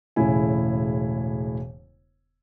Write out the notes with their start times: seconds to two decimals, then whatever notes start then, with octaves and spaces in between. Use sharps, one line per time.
0.16 E1 A2 C#3 E4 G#5